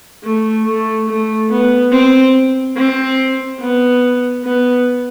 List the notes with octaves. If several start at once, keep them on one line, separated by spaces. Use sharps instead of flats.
A3
A3
A3
B3
C4
C4
B3
B3